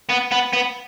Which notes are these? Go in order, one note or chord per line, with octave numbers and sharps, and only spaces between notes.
B3
B3
B3